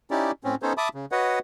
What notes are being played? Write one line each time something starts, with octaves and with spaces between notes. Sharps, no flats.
C#4 D#4 E4 G4 D5
A2 C4 C#4
B3 C#4 D#4 A4 C5 C#5
E5 A5 B5 D6 D#6
C#3
F#4 B4 C#5 D#5 F#5